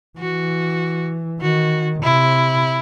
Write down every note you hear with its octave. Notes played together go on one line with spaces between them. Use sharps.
E3 F#4
D#3 F#4
C3 E4